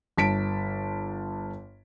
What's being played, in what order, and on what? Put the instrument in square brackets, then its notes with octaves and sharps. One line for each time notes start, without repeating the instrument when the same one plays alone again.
[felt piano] G1 A5 B6 D7